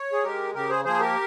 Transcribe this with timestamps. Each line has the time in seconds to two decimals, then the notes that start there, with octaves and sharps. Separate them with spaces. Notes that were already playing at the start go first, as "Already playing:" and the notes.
Already playing: C#5
0.12 G#4
0.23 G#3 G4 A#4
0.54 C#3 G4 A#4
0.69 G#4 C5
0.84 F3 A#3 G#4 C5
1.00 G4 A#4